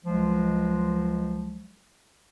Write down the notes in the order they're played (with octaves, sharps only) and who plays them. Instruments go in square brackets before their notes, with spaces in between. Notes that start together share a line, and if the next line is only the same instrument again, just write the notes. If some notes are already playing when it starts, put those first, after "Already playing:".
[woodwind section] C#2 F3 F#3 G#3